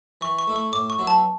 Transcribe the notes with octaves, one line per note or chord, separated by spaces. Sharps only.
E3 C#6
C#6
A3 E4
C#6
A2 D6
C#6
F#3 B3 E4
A5